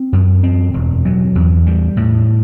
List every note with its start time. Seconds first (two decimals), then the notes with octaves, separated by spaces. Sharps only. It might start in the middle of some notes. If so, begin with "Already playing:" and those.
Already playing: C4
0.13 F#2
0.43 C4
0.74 E1
1.05 F#3
1.35 E2
1.67 G3
1.97 A2